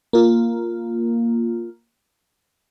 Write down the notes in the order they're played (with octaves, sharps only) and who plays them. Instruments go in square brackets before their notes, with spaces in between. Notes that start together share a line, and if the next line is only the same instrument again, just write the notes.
[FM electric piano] A#3 F4